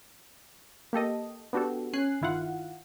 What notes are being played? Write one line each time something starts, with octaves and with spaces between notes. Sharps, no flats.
A#3 G4 A4 D#5
B3 D4 F#4 G4 A4
C#4 G#5 F#6 C7
G1 D#3 E4 F4 F5 F#5